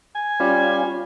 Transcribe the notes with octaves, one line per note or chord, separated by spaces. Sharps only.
G#5
G3 C#4 F4